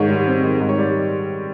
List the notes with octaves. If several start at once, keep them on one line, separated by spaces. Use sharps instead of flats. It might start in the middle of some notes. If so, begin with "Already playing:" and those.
Already playing: G#2 D#3 C#5
G3
C4
D#3
G#2
C#5
G3 D5